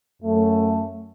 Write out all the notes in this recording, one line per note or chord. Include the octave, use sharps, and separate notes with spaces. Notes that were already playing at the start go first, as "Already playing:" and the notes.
F#2 A3